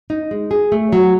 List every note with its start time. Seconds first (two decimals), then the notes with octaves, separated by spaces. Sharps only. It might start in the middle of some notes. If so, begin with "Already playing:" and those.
0.10 D#4
0.31 G#3
0.51 G#4
0.72 A3
0.92 F#3